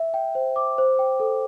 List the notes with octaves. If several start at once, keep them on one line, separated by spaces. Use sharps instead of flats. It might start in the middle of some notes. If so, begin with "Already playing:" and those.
Already playing: E5
G5
C5
D6
C5
G5
A4